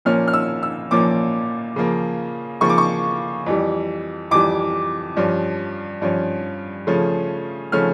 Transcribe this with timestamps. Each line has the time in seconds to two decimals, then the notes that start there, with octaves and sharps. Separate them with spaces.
0.05 A#2 F3 A#3 C#4 F6
0.28 F6
0.33 E6
0.63 E6
0.91 A#2 F3 A#3 C#4 D6
1.76 C#3 F3 A#3
2.61 C#3 F3 A#3 C#6
2.69 D6
2.78 C#6
3.46 F2 E3 G3
4.31 F2 E3 G3 D6
5.17 G2 F3 C#4
6.02 G2 F3 C#4
6.87 C#3 F3 A3 C#4
7.72 C#3 F3 A3 C#4 F6